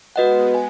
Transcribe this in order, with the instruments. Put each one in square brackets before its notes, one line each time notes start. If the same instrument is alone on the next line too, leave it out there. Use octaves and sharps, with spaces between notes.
[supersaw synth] G#3 B3 [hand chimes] F#4 B4 D#5 F#5
[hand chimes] G#5